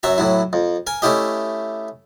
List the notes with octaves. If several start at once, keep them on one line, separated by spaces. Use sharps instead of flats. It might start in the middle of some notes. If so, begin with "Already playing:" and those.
F#2 F#3 E5 A#5
A2 F#3 E4
F2
A#4 G#5
A3 C#4 E4 G4 D#5